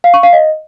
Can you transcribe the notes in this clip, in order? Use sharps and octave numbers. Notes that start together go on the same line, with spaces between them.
F5
C#6
F5
D#5